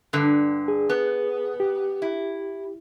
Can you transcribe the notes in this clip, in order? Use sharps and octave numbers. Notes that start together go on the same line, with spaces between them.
G2 D3
G#4
B3
G4
E4